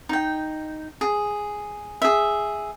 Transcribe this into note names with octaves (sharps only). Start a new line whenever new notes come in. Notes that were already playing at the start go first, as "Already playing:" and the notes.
D#4 G5
G#4
G#4 E5